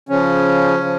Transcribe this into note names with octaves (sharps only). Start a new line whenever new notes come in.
C#3 F3 C#4
C#3 F3